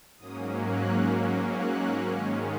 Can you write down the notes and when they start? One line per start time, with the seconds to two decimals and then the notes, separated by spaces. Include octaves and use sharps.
0.18 G#2 F#3 A#3 C#4 D#6
0.64 F#6
1.57 F#6
2.03 G#2 D#3 G#3 C#4